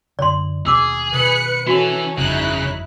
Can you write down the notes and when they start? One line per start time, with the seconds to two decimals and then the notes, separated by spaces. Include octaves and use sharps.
0.19 F#2 D3 D5 C6
0.67 D#2 B2 D#3 G#4 D6 E6
1.12 B2 D#3 B4 F#6 C#7
1.67 E3 C#4 F#4 A4
2.18 G1 F2 C#3 D#4 E4 F#6